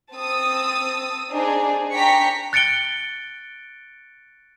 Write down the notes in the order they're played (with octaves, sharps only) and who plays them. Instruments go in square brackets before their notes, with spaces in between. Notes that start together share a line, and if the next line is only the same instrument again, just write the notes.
[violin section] C4 A5 D#6 E6
D4 D#4 G#4 C5
D4 G5 A#5 C#6 B6 C#7
[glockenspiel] F#6 A6 C#7 D7 G7